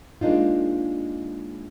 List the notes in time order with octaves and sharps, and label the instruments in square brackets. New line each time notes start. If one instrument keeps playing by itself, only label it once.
[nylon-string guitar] G#3 A#3 D4 D#4 F4